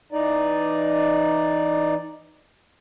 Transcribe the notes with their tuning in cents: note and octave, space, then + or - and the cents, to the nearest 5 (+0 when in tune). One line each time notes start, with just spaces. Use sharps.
E3 +0 D#4 -5 D5 +0